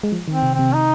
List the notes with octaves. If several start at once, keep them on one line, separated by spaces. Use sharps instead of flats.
G#3
F3
D#3
C4
C3
C3 C4
D#4